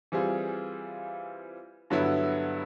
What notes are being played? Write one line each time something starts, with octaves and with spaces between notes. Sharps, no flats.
E3 G3 C4 F4 G#4
G2 D3 F#3 B3 E4